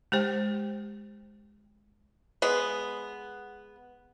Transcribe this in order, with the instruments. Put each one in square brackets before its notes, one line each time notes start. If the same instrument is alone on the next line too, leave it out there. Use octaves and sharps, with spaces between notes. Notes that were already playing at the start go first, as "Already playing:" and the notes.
[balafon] G#3 G4 C5 G5
[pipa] G#3 B3